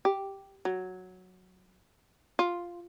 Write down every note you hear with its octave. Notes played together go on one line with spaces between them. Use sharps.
G4
F#3
F4